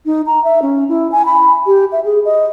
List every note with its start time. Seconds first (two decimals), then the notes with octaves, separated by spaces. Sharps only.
0.06 D#4
0.26 A#5
0.44 E5
0.62 C#4
0.89 E4
1.12 G#5
1.26 B5
1.66 G4
1.92 E5
2.05 G#4
2.25 D#5